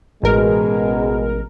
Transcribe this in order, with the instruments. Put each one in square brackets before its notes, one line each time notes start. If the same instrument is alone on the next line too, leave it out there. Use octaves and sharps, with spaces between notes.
[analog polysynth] A1 A#4 [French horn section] B2 G#3